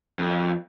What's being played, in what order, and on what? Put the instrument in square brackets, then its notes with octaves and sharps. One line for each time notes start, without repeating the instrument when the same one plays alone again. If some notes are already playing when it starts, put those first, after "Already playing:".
[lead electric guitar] F2